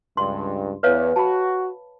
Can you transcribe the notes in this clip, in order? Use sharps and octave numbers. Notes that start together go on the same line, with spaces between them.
C#2 G2 C6
E2 B4 C#5 F5
F#4 A5 B5